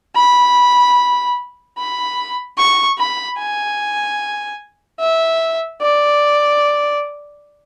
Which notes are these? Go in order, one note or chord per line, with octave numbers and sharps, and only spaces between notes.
B5
B5
C#6
B5
G#5
E5
D5